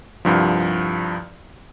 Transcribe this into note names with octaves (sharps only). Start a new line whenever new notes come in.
C2 G2 F3